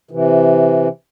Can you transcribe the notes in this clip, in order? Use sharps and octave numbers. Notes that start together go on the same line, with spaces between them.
C3 E3